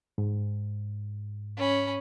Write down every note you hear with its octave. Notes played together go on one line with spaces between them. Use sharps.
G#2
C#4 B5